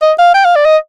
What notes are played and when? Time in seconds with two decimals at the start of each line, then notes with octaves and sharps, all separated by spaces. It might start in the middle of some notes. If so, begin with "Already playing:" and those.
0.02 D#5
0.19 F5
0.34 G5
0.45 F5
0.56 D5
0.65 D#5